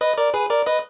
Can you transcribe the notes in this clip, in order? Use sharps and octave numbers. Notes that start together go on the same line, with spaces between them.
B4 D#5
A#4 D5
G#4 B4
A#4 D5
B4 D#5